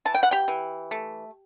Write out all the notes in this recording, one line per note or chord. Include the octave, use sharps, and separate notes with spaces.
E3 A5
G5
F#5
G4 G5
E3
A3